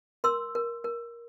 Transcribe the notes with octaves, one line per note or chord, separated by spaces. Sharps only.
A#4 C6 E6
A#4
A#4